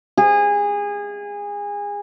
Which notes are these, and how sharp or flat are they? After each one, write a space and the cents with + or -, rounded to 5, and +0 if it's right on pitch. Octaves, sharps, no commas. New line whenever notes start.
G#4 -25